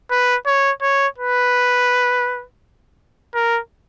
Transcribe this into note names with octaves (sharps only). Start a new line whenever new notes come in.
B4
C#5
C#5
B4
A#4